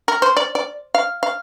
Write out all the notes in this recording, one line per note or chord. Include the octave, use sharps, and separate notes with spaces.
A#4
C5
D5
D5
F5
F5